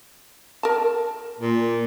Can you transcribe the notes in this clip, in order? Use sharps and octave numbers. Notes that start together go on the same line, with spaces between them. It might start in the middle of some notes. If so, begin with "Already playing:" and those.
A#4 A5
A#2